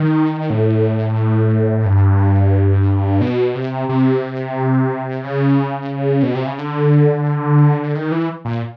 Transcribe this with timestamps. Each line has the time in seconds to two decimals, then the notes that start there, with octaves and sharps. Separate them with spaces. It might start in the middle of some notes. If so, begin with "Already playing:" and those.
Already playing: D#3
0.50 A2
1.85 G2
3.21 B2
3.55 C3
3.89 C3
5.24 C#3
6.23 B2
6.35 C3
6.47 C#3
6.59 D3
7.95 D#3
8.12 E3
8.45 A#2